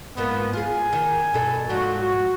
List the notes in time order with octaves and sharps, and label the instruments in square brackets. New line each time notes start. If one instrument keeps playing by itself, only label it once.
[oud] G#2 F3 A#3 [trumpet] B3
[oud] F4 G#4 [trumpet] G#5
[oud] D#3
G2 B2 A4
[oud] G#2 F3 F#3 [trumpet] F#4
[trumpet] F#4